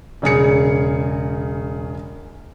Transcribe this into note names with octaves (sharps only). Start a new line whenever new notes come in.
E1 C#3 G#4 C#7